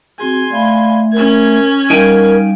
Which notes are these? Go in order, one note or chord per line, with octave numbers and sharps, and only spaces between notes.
C4 F#4 G#4 G#5 C6
A3 D5 F5 B5
C#4 A#4 G#5 G#6
G3 D#4 A#4 F5 G5 G#5